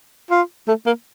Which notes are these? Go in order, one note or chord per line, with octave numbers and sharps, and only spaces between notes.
F4
A3
A#3